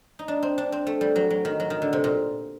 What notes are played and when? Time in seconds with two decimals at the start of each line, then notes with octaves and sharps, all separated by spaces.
0.19 D#4
0.28 D4
0.43 C4
0.58 D4
0.72 C4
0.87 A3
1.01 G3
1.16 F#3
1.30 F#3
1.45 D#3
1.60 F#3
1.70 D#3
1.82 D3
1.93 C3
2.04 A#2